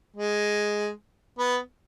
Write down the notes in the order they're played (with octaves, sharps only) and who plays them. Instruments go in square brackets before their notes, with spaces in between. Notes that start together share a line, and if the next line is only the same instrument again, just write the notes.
[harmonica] G#3
B3